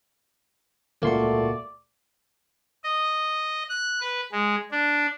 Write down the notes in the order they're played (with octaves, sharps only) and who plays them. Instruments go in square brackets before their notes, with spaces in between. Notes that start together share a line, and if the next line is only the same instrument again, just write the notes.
[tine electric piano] C#2 A#2 C6 [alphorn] A3 [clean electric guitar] A#3 F#4 [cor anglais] D5
[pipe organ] D#5
F#6
B4
G#3
D4